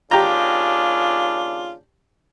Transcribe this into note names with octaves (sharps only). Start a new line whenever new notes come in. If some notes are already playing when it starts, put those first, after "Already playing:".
D#2 C#3 D4 F4 G4 A#5